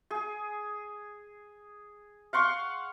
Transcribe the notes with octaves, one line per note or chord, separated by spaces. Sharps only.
G#4
F5 F#5 C6 C#6